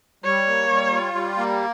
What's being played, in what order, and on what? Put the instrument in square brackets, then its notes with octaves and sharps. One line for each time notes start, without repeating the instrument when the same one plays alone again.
[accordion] G3 [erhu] C#5
[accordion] A#3
G3
F4
G3
A#3